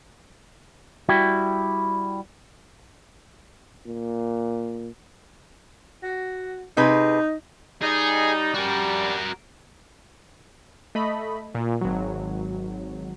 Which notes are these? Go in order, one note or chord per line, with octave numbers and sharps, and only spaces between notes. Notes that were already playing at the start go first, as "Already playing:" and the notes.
G3 E4 F#4 G5
A#2
F#4
C3 D#4 G#4 B4
G3 D#4 G#4
G3 F#4 A#4
A3 D#5 B5
A#2
G#1 F#3